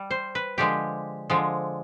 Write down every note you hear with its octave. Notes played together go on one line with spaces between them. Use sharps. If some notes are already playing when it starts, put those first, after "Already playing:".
Already playing: G3
C5
B4
D3 F3 G#3 G4
D3 F3 G#3